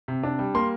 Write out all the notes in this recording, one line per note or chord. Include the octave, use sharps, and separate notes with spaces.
C3
D4
G3
A#3 C6